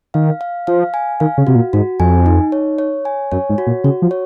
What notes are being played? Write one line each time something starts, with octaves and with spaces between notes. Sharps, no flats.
D#3 F5
F5
F3 F5
G#5
D#3 F5
C#3
C3 F#4
A#2
G#2 F#4
F2 G#5
D#4
C#5
C#5
G#5
F#2 C#5
G#2
F#4
A#2
C#3 F#4
F3
C#5